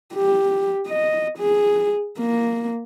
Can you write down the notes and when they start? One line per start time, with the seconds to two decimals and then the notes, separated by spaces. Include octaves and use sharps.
0.14 G4
0.87 D#5
1.39 G#4
2.19 A#3